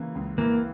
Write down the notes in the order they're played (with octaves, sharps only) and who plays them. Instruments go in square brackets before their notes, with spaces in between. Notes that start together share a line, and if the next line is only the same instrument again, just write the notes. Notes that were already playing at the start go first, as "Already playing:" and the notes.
Already playing: [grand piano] C#3 E3 A#3
C#2
[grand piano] E3 [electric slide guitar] A#3